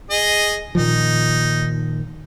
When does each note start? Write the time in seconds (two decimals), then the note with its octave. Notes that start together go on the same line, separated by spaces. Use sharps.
0.10 G#4 D#5
0.75 A#2 D#3 F3 D#4